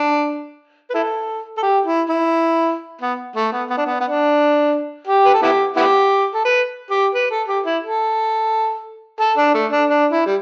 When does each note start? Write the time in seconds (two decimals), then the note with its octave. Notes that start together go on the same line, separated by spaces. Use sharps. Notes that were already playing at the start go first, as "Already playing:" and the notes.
Already playing: D4
0.90 B4
0.94 E4 A4
1.58 A4
1.63 G4
1.86 E4
2.09 E4
3.01 B3
3.36 A3
3.52 B3
3.70 B3
3.78 D4
3.86 B3
4.00 B3
4.04 D4
5.07 G4
5.25 B4
5.34 A4
5.42 B3 E4 G4
5.76 B3 E4 G4
6.34 A4
6.45 B4
6.91 G4
7.15 B4
7.31 A4
7.48 G4
7.66 E4
7.83 A4
9.20 A4
9.37 D4
9.54 A3
9.72 D4
9.89 D4
10.12 E4
10.26 G3